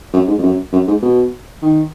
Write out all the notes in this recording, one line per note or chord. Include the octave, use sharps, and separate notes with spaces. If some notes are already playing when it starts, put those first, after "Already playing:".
F#2
G#2
F2
F#2
F#2
G#2
B2
D#3